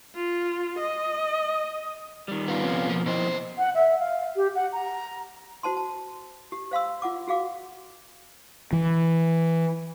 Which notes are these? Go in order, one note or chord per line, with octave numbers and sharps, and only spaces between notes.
F4
D#5
D#3 G3
B3 F4
C3 F3 C#4
B2 F3 A#3
B2 F3 E4 C5 D#5
F#5
E5
F5
G4
F#5
A#5
F#4 C5 A5 C6
A5
G4
C5 F5 C6 E6
F4 F#5 D6
F#4 G#4 F5 D6
E3